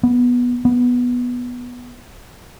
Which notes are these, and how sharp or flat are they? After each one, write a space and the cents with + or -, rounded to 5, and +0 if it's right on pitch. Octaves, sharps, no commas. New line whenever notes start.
B3 -10
B3 -5